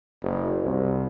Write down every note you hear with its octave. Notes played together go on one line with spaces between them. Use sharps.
F#1
C2